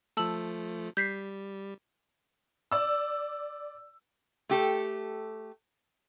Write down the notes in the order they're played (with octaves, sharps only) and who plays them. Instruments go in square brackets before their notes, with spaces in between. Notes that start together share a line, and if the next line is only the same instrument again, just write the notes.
[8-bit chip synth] F3 A3 [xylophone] A5 E6 F#7
[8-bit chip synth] G3 [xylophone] G6 B6 C7
[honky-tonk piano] D5 E6
[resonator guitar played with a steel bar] A3 G4 A4